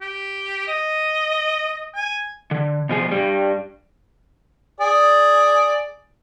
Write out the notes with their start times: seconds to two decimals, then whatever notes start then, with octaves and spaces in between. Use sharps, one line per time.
0.01 G4
0.67 D#5
1.94 G#5
2.51 D3
2.89 B2 F3 G#4
3.11 G2 G3
4.81 G#4 D5